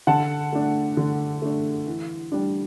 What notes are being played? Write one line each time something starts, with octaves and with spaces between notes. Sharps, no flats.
D3 F#5 A5
A3 D4
D3
A3 D4
E3
G3 D4